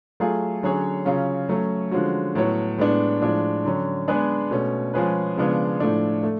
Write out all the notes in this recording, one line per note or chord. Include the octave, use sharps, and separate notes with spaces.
F#3 A3 F4 G#4
D3 F#3 C#4 G#4 C#5
C#3 F#3 C#4 F4
F#3 A3 C#4
D3 F3 G#3 C#4 F#4
A2 F#3 B3 F#4 C#5
A2 G#3 B3 D4
A2 F3 G#3 D4
D3 F#3 C#4
G#3 B3 D4 G#4 B4
B2 A3 C#4
F3 G#3 C#4 G#4 B4
C#3 F3 G#3 B3 D4
A2 F3 A3 D4
A3